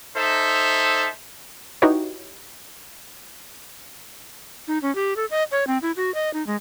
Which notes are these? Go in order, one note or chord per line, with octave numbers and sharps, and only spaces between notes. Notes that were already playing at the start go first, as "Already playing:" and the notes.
D#4 A4 C5 E5
D#4 E4 F#4 G4 B4 C#5
D#4
C#4
G4
A4
D#5
C#5
C4
E4
F#4
D#5
D#4
G#3